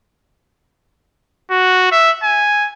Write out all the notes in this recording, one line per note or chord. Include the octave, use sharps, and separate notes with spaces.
F#4
E5
G#5